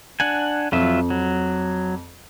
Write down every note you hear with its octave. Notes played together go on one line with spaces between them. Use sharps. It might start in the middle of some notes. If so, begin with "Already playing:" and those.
D4 F#5 G#5
F2 F#3 F4 E5
F#3